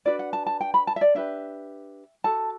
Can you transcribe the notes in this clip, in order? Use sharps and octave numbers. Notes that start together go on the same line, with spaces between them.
D4 F#4 B4 D5
F#5
A5
A5
G5
B5
A5
E5
D5
D4 G4 B4 E5
F#4 A4 A5